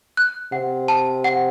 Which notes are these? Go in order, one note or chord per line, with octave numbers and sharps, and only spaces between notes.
F#6
C3 F#5
A5
F#5